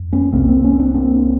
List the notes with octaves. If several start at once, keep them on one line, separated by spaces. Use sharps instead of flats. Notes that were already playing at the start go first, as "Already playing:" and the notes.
Already playing: F2
B3 C#4
C2 C3 A#3 C4
A#3 C4
B3 C#4
C4 D4
A#3 C4